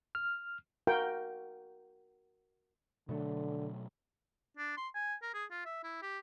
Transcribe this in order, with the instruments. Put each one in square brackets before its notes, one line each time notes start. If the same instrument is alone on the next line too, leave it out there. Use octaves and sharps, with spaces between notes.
[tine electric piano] F6
[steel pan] F#4 A#4 F5 G5
[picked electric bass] B2 F#3 A3 [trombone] D3
[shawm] D4
C6
G#5
A#4
G#4
F4
E5
E4
G4